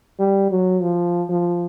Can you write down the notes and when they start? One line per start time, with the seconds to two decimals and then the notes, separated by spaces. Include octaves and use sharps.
0.19 G3
0.51 F#3
0.82 F3
1.29 F3